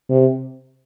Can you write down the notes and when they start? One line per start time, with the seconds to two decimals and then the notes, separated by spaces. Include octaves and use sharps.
0.10 C3